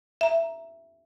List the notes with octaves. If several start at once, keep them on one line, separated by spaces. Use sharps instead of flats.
E5 A#5